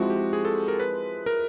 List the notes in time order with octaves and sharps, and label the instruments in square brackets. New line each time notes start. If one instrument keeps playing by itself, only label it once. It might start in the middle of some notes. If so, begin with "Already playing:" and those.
Already playing: [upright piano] F3 G#3 C4 E4 [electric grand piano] F#4
[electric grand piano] G4
G#4
A4
A#4
B4
A#4